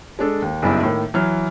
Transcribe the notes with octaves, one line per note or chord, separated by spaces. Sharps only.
G#3 D4 A4
D#2
F#1 B1 G2 E4 A5
A2 D#3 A#3
E3 F#3 F6